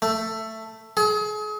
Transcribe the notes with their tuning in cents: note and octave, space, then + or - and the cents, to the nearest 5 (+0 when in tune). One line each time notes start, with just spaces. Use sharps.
A3 +10
G#4 +35